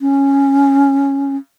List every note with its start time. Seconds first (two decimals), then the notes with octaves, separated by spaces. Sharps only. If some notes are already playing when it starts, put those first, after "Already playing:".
0.01 C#4